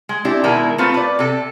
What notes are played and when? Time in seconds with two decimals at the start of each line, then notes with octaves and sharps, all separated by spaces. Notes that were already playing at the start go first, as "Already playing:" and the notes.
0.09 G#3
0.25 C4 D4 E4 G4
0.44 B2 D#3 G#3 E4 A#4
0.78 A3 C4 F4 B4 C5
0.94 B4 D5
1.19 C3 A4